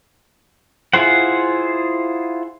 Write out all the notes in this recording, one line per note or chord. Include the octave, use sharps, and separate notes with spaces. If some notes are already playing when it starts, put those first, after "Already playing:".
E4 F4 G#4 C5 F#5